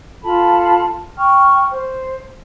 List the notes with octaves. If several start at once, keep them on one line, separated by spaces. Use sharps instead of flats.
F4 A4 A5 B5
G5 C#6 F6
C5